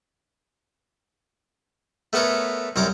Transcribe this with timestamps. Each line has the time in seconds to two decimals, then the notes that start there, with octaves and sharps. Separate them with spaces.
2.13 A3 B3 A4 A#4 C#5
2.76 C2 F#2 C#5 A#5 D6